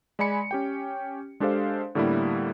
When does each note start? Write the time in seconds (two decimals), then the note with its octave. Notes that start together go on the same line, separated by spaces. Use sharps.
0.19 G#3 D5 G#5 B5 C#7
0.51 C#4 G4 G5
1.40 G#3 D4 G4 A4 C5 F5
1.95 A2 D3 G3 A#3 B3 E4